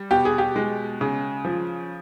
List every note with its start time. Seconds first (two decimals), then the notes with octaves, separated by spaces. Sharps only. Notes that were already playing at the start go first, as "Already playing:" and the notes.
Already playing: G3
0.11 B2 G4
0.25 G#4
0.38 G4
0.56 G#3
1.01 C#3
1.45 F3